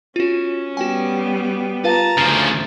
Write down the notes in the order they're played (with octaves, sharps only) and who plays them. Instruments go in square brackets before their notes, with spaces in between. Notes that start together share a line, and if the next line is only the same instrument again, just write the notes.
[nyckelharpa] C#4 [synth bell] F4 F#4
[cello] G3 B3 [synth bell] F#4 G5 G#5
[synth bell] F4 B4 F5 [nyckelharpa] A5 A#5
[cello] D2 [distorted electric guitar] C#3 F3 [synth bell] A6 C7 D7